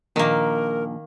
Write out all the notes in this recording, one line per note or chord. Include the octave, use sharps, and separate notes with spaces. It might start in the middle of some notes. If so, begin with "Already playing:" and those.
A#1 D#3 A#3 A#4